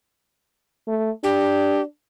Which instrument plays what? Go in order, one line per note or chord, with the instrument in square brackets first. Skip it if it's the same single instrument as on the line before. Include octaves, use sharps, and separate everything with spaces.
[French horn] A3
[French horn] D4 [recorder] G4